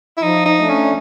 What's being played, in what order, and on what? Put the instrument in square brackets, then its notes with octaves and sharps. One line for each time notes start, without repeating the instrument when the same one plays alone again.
[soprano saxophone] E4
[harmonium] F3 [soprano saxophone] D#4
[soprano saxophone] D#4
[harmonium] A3 D4
[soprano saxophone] C#4